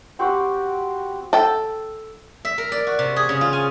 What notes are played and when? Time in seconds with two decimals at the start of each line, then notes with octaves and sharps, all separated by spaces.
0.19 C4 F#4 G4 B5
1.33 A4 G5
2.45 E5
2.58 A#4
2.72 D5
2.87 F#4
2.99 C3
3.16 G#4
3.29 C#3
3.41 F4
3.53 G#5